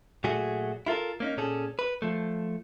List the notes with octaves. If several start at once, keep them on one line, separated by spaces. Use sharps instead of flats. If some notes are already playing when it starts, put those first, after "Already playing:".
A#2 F#3 A3 F#4 G#4
E4 F4 A4 A#4
A#3 C#4 D#4
A#2 C#4 G#4 A4
B4
F3 A3